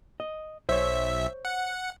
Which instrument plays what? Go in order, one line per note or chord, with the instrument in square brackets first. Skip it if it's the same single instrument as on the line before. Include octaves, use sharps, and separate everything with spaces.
[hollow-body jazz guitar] D#5
[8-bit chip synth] B1 E5 [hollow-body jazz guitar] C5 C#5
[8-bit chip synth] F#5